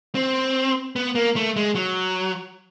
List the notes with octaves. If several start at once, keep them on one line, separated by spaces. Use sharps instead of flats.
C4
B3
A#3
A3
G#3
F#3